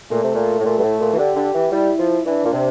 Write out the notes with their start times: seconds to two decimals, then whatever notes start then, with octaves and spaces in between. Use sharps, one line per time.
0.10 A#2 A3
0.23 C3
0.35 A#2
0.59 A2
0.64 A#2 A3
0.78 G2
0.82 A2
1.00 A#2
1.13 E3
1.18 D3 G4
1.36 D3
1.54 E3
1.72 G3 E4
1.99 F3
2.25 E3 D4
2.45 A#2
2.53 C3